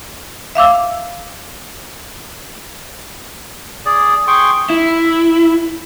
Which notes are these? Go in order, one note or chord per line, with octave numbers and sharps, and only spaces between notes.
E5 F5 D6 E6
G#4 D5
G#4 G5 C6 C#6
E4